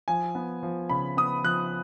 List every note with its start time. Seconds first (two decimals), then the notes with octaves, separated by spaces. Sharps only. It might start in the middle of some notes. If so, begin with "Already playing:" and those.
0.08 F3 G#5
0.35 B3
0.63 F3
0.89 C#3 B5
1.17 B3 D#6
1.44 F3 F#6